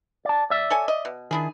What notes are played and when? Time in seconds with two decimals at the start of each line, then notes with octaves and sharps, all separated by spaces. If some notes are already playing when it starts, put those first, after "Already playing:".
0.25 D5 A5
0.50 D5 E5
0.70 A4 C#5 G#5
0.88 D#5
1.05 B2
1.31 D#3 D4 E4 G#4